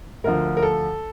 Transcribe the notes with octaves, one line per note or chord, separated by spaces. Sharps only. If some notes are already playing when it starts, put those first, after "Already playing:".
D2 D3 F3 A#4
A#4
A4